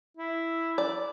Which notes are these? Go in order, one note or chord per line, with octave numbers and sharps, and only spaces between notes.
E4
D5